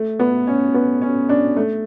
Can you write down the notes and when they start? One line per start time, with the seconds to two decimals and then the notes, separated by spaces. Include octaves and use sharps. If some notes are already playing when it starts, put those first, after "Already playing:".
Already playing: A3
0.20 B3
0.47 C#4
0.74 B3
1.02 C#4
1.29 D4
1.57 A3